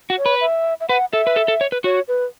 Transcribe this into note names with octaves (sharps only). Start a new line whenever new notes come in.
F#4
C#5
B4
E5
E5
B4 F#5
A4 E5
B4
A4
A4
C#5
B4
F#4 C#5
B4